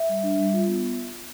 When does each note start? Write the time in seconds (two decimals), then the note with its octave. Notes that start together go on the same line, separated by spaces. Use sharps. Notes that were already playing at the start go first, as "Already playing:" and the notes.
Already playing: E5
0.09 G3
0.23 D4
0.39 G3
0.53 F4
0.68 B3